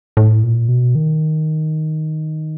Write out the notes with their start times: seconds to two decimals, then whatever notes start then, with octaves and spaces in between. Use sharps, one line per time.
0.17 A2
0.43 A#2
0.69 B2
0.95 D#3